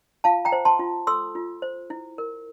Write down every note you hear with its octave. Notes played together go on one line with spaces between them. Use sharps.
F4 F5 A5
G5 A#5
C5
A5 C6
F4
A4 C6 E6
F4
C5
E4
A#4